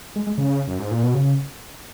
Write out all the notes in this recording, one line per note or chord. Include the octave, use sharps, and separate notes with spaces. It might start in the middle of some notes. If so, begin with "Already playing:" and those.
G#3
G#3
C#3
F#2
G#2
A#2
B2
C#3